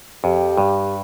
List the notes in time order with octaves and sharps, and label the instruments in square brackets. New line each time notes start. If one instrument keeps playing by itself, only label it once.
[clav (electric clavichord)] F2 [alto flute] G4
[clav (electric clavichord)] G2